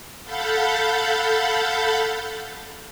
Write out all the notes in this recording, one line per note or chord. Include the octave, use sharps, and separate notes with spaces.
A4 F5 F#5 B5 G6 A6